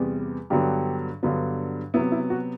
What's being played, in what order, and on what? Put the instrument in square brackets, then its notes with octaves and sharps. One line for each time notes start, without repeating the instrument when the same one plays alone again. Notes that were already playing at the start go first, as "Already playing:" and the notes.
Already playing: [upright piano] E2 C3 G3 B3
G2 D3 F#3 B3 G4
G2 D3 F#3 B3
C3 F#3 B3 E4
E4
F#4